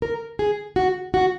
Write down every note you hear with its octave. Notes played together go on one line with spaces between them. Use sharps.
A#4
G#4
F#4
F#4